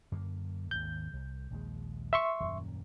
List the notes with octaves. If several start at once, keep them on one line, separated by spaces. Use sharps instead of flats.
F#2 D3 A#3
G#1 D#2 G6
C2
A#1 D#2 G#3
E5 C6 C#6
D#1 F#2 A#2